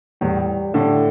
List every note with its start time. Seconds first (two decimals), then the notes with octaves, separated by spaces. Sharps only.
0.21 E2 A2 G3
0.74 A2 D3 A3